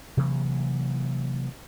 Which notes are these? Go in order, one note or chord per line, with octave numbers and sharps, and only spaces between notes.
C3 E3 F#3 A#3